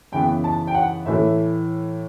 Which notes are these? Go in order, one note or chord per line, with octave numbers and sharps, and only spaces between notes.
F#2 C#3 E3 B3 G5
A5
G5
F#5
A2 E3 A3 E5